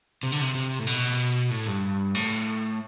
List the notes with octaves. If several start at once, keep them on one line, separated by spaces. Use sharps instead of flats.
C3
D3
C3
C3
A2
B2
A2
G2
A2